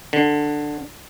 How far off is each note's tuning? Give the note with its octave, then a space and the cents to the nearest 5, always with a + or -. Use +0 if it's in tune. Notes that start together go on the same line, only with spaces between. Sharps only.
D3 +10